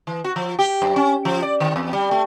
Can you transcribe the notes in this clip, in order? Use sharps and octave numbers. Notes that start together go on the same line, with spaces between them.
E3
F#4
F3
G4
F#2
C#4
F3
D5
D#3
E2
G3
A3